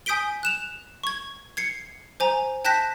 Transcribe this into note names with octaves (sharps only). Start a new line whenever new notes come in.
G#5 D#6 G6 B6 D7 G7
F#6 E7 F7
C#6 G#6
G#6 C7 C#7
C5 G#5 A#5
G5 A5 F#6 G6 A#6 B6